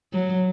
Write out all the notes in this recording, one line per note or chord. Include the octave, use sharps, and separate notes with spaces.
F#3